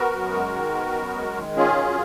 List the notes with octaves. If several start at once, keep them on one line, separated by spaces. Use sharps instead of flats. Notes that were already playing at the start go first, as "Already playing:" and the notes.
Already playing: B3 F#4 A#4
F#2
G#3
D#3
B3
F#2
G#3
D#3
C#4 F4 G#4
F#2